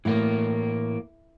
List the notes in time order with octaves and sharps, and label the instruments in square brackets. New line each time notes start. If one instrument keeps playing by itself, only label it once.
[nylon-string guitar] A2 [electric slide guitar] E3 A#3